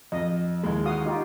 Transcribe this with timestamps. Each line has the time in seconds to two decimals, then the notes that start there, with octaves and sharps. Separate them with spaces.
0.12 F2 D#5
0.63 D#2 E3 G#3
0.85 F#4 F5 D#6
1.06 D#4 F4 G4